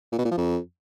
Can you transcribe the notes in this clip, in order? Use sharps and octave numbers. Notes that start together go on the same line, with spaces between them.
A#2
B2
A#2
F3
F2